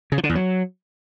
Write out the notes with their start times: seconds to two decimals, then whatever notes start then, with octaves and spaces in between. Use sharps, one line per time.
0.12 C#3
0.18 F3
0.24 D3
0.29 E2
0.35 F#3